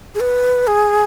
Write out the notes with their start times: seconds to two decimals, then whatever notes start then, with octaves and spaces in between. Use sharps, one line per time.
0.15 G#4
0.20 B4
0.67 G#4